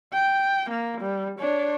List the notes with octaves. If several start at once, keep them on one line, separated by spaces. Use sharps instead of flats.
G5
A#3
G3
D4 C#5